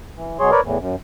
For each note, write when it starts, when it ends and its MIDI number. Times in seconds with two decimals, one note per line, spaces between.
0.16 0.38 52
0.40 0.51 47
0.40 0.51 54
0.40 0.51 68
0.40 0.51 73
0.40 0.51 84
0.51 0.61 70
0.51 0.61 71
0.51 0.61 73
0.51 0.61 74
0.65 0.78 40
0.65 0.78 45
0.65 0.78 52
0.80 0.96 42